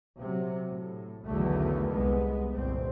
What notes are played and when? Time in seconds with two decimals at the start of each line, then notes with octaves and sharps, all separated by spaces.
0.19 C3 F#3
0.70 A2
1.26 B1 E2 D3 D#3 F#3 A3
1.91 C2 G#3 B3
2.54 G1 C2 A#2 C4